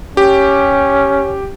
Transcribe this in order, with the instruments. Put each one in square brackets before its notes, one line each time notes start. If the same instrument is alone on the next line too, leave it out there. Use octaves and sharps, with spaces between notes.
[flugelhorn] C#4 [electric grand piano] G4